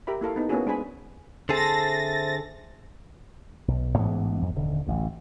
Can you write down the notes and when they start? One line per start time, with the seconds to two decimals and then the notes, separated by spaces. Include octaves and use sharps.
0.07 G4 A#4 E5 B5
0.21 A#3 E4 A4 F5
0.36 B3 D#4
0.49 A#3 B3 C#4 E4 F#4 G#4
0.66 G#3 D4 G#4 C5 G#5 B5
1.49 D3 C4 G#4 A4 C5 E5 A6 A#6
3.68 B1
3.98 A1 G#2 E3 B3
4.42 F2
4.55 D#1 D3
4.87 A1 D2